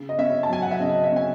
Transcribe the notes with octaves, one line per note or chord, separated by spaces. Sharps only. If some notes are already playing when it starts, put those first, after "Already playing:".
Already playing: C#3
D#5
C#4 E5
A5
F#3 G#5
F#5
E5
C#3 D#5
D#5
E5
C#4 G#5